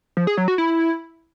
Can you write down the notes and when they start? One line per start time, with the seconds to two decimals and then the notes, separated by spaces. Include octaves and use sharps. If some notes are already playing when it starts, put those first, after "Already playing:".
0.17 F3
0.27 G#4
0.37 F#3
0.48 F#4
0.58 E4